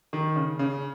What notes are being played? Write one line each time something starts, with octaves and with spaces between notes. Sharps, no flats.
D#3
C#3
C#3